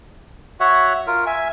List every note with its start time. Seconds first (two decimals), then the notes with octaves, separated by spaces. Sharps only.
0.60 F#4 C#5 E5 F#5
1.07 F4 A#4
1.26 E5 G#5